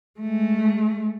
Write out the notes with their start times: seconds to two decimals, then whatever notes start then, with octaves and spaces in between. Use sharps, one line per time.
0.20 G#3 A3